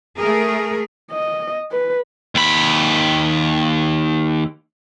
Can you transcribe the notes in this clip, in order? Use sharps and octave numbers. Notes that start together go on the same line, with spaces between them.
A3 G#4 A#4
D#5
B4
D#2 B5